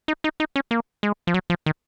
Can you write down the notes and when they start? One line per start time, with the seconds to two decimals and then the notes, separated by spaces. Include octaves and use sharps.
0.08 D#4
0.24 D#4
0.40 D#4
0.56 C#4
0.71 A#3
1.03 G#3
1.27 F3
1.34 F#3
1.50 F3
1.66 D#3